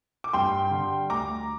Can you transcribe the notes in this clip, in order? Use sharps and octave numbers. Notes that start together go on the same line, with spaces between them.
D6
G2 G5 C6
D3 G3
D2 A#5 D6